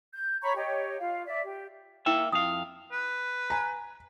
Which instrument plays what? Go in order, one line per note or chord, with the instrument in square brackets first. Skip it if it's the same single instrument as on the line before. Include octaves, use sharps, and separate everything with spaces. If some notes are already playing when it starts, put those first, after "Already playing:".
[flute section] G6
C#5 A#5 B5 C#6
G4 C#5 D#5
F4 F5
D5 E5
G4
[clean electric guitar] A#3 E5 [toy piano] E4 G5
[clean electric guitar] F2 F5 [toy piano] D#6
[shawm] B4
[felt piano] G#5 A#5